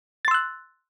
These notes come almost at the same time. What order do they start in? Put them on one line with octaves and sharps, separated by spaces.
A6 C6 E6 F#6